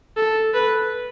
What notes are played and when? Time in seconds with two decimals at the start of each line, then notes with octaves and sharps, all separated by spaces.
0.17 A4
0.54 B4